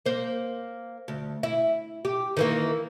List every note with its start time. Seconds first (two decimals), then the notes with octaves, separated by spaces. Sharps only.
0.06 A#3 C5
1.08 D2
1.43 E4
2.05 G4
2.37 D#3 E3 A#3